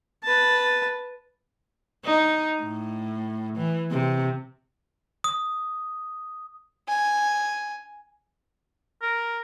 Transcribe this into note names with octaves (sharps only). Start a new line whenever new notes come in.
B4 A5
D#4
A2
E3
C3
D#6
G#5
A#4